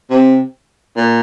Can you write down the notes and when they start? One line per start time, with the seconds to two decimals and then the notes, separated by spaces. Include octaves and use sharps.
0.10 C3
0.97 A#2